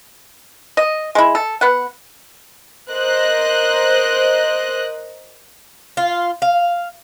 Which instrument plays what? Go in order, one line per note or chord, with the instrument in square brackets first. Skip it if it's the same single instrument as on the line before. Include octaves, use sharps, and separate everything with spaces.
[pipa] D#5
G#3 E4
A4
B3 F#5
[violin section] A#4 C5 D#5 F#6
[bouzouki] F4
F5